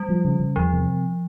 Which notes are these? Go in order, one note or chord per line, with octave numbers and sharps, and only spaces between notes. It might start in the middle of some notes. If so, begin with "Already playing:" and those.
Already playing: G3
F3
C#3
C#3
E2 F3
C3